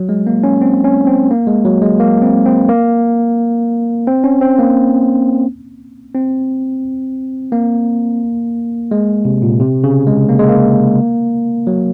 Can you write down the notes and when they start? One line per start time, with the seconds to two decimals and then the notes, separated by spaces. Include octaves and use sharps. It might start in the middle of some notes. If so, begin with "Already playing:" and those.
Already playing: F#3
0.09 G#3
0.27 A#3
0.44 C#4
0.62 C4
0.84 C#4
1.07 C4
1.31 A#3
1.47 G#3
1.65 F#3
1.82 G#3
2.00 A#3
2.22 C4
2.46 C4
2.69 A#3
4.07 C4
4.24 C#4
4.41 C4
4.59 A#3
6.14 C4
7.52 A#3
8.91 G#3
9.25 C3
9.43 A#2
9.60 C3
9.84 C#3
10.07 G#3
10.29 A#3
10.39 G#3
10.49 A#3
11.67 F#3